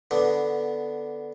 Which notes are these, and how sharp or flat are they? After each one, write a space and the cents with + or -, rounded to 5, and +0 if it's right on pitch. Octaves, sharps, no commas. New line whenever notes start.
D3 +0 B3 +0 D4 +0